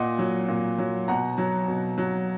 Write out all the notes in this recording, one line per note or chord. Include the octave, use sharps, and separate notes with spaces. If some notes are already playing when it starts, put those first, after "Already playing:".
Already playing: A#2 D#5 F#5
F#3
A#2
F#3
B2 F#5 A#5
F#3
B2
F#3